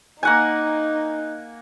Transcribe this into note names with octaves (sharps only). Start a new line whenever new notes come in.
A#3 D#4 F#5 G#5